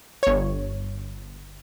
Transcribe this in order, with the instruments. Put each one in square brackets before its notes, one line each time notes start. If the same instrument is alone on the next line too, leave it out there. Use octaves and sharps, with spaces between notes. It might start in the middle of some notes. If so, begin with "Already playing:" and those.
[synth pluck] G1 C#5